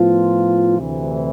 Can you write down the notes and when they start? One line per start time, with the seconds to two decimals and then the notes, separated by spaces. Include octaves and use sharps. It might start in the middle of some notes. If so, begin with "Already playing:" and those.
Already playing: A2 F3 B3 F4
0.78 D2 C3 E3